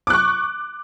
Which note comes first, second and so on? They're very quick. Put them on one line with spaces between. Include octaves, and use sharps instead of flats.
D6 F#6 C#6